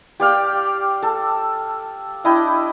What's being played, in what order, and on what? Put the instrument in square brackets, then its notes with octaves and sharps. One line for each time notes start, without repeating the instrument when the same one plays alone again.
[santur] G4 D5 F5 G5
A4
D4 E4 D#5 G5